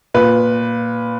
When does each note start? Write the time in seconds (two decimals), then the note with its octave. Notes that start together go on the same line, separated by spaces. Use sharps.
0.14 A#2 B4